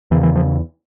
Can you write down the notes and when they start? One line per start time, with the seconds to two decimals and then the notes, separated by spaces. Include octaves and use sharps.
0.11 E2 C#3 E3
0.23 E3
0.36 F3